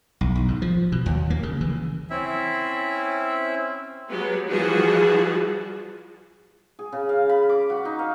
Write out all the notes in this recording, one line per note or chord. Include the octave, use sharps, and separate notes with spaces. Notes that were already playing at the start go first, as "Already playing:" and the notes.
B1
B1
G#2
F3
B2
D#2
A#3
C#3
E3
C4 C#4 E4 E5
F#3 G#3 B3 G4
E3 F3 G3 F#4 G#4 A5
G#4
C#3
F5
B5
D6
F#4
D#4
F5